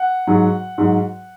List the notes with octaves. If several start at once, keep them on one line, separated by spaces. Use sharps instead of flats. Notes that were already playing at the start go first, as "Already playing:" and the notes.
Already playing: F#5
G#2 F#3
G#2 F#3